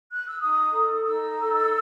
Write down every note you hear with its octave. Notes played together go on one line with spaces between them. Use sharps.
F#6
E6
D#4 D#6
A4
D#4 E6
A4